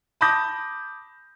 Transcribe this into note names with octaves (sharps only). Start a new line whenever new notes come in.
A5 B5 D6 D#6 G6 A#6